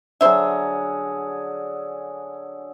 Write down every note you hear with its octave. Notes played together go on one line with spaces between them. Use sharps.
D3 F#3 G#4 C5 E5